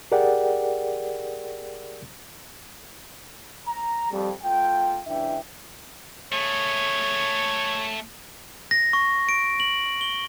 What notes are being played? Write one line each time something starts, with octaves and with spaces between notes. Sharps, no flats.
G4 G#4 A#4 D5 F#5 G5
A#5
F2 G3
A3 F4 G5
C#2 E3 D4 E5 G5
A3 G#4 C#5
A#6
C#6
D7
F#7
G7